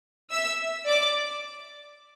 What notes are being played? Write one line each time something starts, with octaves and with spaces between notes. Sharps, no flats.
E5 E6
D5 D6